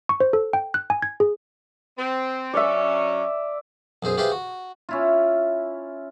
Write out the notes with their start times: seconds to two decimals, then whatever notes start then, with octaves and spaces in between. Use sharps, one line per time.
0.09 C#6
0.20 C5
0.33 A4
0.53 G5
0.74 F#6
0.90 G#5
1.02 G#6
1.20 G#4
1.98 C4
2.53 F#3 C#4 D5 E5
4.03 B1 F#2 G#4 C5
4.18 F4 G4 G#4 B4 C5 E5
4.32 F#4
4.89 C#4 E4 F4